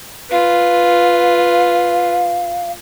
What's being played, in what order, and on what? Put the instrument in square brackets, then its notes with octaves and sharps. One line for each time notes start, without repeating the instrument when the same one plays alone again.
[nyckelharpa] F4 B4 [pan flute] F5